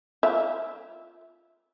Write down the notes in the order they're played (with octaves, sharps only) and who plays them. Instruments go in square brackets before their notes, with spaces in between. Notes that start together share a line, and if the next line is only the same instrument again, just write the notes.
[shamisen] F4 E5